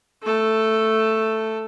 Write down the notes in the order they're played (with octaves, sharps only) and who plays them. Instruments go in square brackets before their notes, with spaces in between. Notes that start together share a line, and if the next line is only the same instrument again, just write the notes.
[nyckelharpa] A3 A4